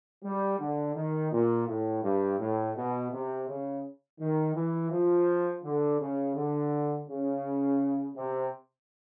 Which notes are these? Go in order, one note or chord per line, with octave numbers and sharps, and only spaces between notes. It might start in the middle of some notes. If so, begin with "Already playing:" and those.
G3
D3
D#3
A#2
A2
G2
A2
B2
C3
C#3
D#3
E3
F3
D3
C#3
D3
C#3
C3